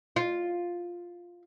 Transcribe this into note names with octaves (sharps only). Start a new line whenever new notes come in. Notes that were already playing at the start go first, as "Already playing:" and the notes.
F4